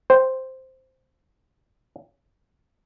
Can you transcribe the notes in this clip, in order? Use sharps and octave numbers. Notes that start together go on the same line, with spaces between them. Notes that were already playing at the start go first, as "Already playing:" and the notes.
C5 G5